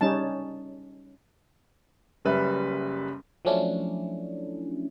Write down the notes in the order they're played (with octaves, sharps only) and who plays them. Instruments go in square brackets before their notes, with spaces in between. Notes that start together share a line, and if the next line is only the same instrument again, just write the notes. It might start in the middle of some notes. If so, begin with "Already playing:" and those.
[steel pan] G3 C#4 D#4 A5
[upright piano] F#1 F#2 G3 B4 E5
[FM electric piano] F3 F#3 A3 C#4 D4 E4